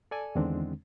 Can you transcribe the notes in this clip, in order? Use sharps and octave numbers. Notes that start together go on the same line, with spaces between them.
A4 D5 G#5
E2 D3 D#3 G#3 C4 D4